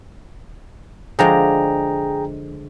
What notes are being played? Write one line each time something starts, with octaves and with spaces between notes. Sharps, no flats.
D3 F3 G#3 G#4 G5 A#5